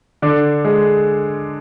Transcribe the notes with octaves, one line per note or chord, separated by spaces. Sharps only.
D3 D4
G#3 G#4